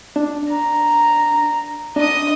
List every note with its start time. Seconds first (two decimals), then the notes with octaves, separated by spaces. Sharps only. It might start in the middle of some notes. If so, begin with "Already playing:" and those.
0.16 D4
0.50 A#5
1.96 D4 D#5 D#6